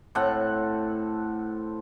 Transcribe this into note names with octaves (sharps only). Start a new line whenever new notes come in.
A2 C4 A4 F#5